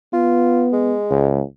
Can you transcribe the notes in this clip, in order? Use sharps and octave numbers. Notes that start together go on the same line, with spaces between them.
B3 F4
G#3
C#2